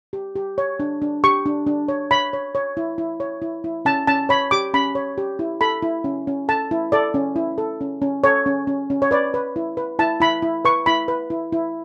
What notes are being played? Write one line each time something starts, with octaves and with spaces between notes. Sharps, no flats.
G4
G4
C#5
D4
D4
G4 C#6
D4
D4
C#5
C#5 B5
C#5
C#5
E4
E4
C#5
E4
E4
C#4 A5
C#4 A5
C#5 B5
G4 D6
C#4 B5
C#5
G4
E4
A4 B5
E4
C#4
C#4
A4 A5
E4
A4 D5
C#4
E4
A4
C#4
C#4
A4 C#5
C#4
C#4
C#4
C#5
B4 D5
B4
E4
B4
E4 A5
E4 B5
E4
B4 C#6
E4 B5
B4
E4
E4